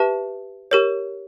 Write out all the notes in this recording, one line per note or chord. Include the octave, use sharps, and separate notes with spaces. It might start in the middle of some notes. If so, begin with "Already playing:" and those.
Already playing: G4 B4 E5 A5
G4 A#4 C#5